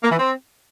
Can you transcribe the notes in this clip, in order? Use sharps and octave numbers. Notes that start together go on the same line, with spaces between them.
A#3
E3
C4